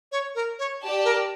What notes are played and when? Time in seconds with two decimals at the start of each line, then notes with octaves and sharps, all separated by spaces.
0.12 C#5
0.35 A#4
0.59 C#5
0.81 G4 D5 A5
1.05 A#4